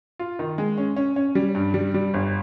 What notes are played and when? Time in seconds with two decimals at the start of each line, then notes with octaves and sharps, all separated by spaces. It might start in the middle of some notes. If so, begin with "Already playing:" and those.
0.19 F4
0.39 D#3
0.58 G#3
0.78 C#4
0.96 C#4
1.16 C#4
1.35 G3
1.55 G2
1.74 G3
1.94 G3
2.14 G1